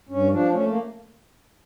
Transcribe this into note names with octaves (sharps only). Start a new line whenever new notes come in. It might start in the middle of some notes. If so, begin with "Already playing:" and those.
G2 C#4
F3 D4
A3 C#4
A#3